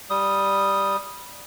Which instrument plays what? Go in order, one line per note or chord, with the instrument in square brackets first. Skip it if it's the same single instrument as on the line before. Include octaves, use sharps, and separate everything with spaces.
[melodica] G3 D#6